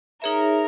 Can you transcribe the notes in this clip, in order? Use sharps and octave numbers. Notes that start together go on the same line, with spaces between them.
D#4 G#4 A#4 C#5 E5